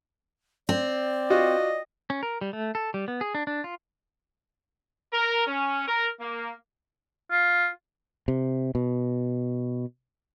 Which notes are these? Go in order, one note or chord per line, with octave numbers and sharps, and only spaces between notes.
C4 D5
F4 F#4 D#5
C#4
A#4
G3
A3
A4
G3
B3
G#4
D4
D4
F4
A#4
C#4
A#4
A#3
F4
C3
B2